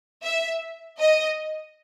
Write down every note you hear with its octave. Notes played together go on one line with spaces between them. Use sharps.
E5
D#5